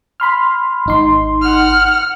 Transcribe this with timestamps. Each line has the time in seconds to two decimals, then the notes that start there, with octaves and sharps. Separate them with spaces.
0.20 B5 C6 F6
0.86 G#1 D#4 C6
1.42 F#5 F6